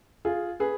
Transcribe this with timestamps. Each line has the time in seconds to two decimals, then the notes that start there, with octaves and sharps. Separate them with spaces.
0.25 F4 G#4
0.60 G#4 B4